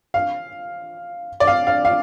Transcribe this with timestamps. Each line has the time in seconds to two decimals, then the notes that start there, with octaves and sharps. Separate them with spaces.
0.14 F5
1.40 D5
1.47 F5
1.67 F5
1.85 F5